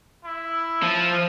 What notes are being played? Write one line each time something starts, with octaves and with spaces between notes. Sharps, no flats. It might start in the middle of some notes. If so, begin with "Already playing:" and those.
E4
F3